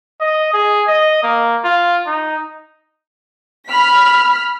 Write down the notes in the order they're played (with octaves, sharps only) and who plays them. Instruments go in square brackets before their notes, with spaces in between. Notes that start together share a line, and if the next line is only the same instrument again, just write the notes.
[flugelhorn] D#5
G#4
D#5
A#3
F4
D#4
[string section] B5 F6 B6